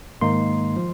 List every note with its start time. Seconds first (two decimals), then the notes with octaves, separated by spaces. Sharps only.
0.21 G#2 D#3 A#3 D#4 C6
0.77 F3